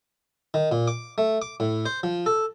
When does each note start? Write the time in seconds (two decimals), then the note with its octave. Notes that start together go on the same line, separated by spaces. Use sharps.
0.54 D#3
0.71 A#2
0.88 D6
1.18 A3
1.42 D6
1.60 A2
1.86 C5
2.03 F3
2.26 A4